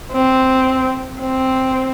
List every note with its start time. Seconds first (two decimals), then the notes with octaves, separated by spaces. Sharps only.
0.12 C4
1.21 C4